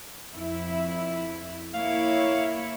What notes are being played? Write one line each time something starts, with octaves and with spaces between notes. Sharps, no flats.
F2 E4
A#3 E4 C#5 F5